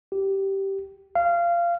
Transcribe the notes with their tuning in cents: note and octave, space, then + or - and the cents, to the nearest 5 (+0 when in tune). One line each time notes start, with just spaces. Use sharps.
G4 -10
F5 -20